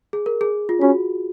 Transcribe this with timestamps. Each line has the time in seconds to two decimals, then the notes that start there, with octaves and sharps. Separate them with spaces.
0.13 G#4
0.26 A#4
0.41 G#4
0.69 F4
0.81 C#4 F#4